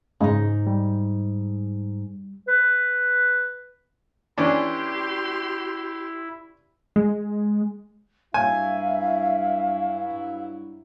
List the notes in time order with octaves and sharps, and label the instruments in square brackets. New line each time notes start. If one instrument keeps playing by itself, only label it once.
[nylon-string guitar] G#2 D#4 [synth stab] C#3 G#3
[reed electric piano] G3
[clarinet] B4
[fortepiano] E3 C#4 D4 [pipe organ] E4 [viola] G4 C6
[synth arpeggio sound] G#3
[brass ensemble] G2 F#3 E4 [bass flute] E5 [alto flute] F5 [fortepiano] G#5